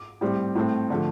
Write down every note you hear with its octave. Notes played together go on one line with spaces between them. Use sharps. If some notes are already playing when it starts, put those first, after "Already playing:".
Already playing: D6
A2 G3 C4
A2 A3 C4
D3 F3 A3